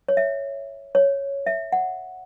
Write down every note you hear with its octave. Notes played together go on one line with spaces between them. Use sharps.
C#5
E5
C#5
E5
F#5